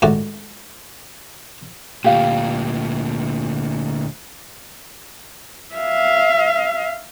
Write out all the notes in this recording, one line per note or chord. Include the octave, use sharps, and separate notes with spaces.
C#2 A2 D#3 F#4 D5
D2 A#2 G4 F5
E5 F5